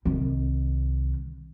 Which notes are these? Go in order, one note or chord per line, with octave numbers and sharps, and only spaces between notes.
C2 D#3